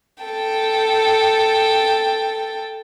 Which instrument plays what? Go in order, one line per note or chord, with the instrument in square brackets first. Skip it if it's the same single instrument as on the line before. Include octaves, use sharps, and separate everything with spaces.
[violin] A4 G5